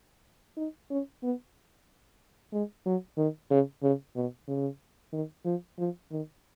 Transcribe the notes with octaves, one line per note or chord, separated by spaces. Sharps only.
D#4
C#4
B3
G#3
F#3
D#3
C#3
C#3
B2
C#3
D#3
F3
F3
D#3